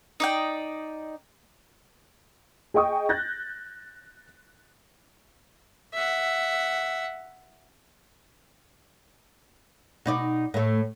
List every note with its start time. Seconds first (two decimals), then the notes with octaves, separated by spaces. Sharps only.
0.20 D#4 D5 G5
2.74 G#4 D#5 G5 C#6 D#6
3.09 F#6 G6 A6 A#6
5.94 E5 F#5
10.06 B2 D#4 D5
10.54 A2 A3